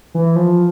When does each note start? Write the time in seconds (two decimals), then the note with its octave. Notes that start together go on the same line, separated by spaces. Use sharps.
0.15 E3
0.36 F3